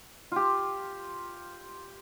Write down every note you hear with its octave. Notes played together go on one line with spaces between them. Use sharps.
F4 G4